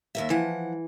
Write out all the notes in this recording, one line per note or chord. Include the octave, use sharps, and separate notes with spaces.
D#2 A#4 E5
E3 F3 F#5